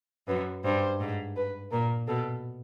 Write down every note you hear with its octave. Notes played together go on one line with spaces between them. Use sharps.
F#2 B4
G2 C5
G#2
B4
A#2 A#4
B2 A4